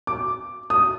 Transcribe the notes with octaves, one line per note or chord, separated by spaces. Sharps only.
D6
D#6